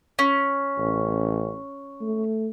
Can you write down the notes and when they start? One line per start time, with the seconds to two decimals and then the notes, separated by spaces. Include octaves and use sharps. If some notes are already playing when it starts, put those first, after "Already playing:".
0.19 C#4
0.78 A1
2.01 A3